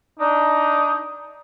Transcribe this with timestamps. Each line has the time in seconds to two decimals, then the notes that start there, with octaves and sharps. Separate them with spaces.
0.19 D4 D#4